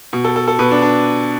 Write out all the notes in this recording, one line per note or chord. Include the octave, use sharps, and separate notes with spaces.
B2
A4
A4
A4
B2 B4
D4
D4